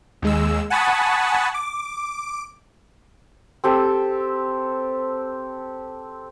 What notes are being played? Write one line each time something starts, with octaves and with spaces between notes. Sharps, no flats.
D#2 G#3 E6
F#5 G#5 A5 B5 C#6 D#6
D6
C4 G4 A4